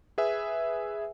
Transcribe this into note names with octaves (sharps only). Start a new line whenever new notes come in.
G#4 B4 E5 G#5